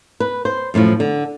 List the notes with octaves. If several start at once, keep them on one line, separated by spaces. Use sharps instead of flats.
B4
C5
F#2 A2 E3 F3
D3